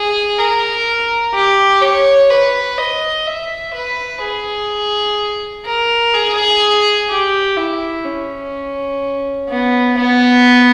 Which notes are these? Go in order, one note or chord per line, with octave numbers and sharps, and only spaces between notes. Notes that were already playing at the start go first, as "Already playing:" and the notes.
Already playing: G#4
A#4
G4
C#5
B4
D#5
E5
B4
G#4
A#4
G#4
G4
E4
C#4
B3
B3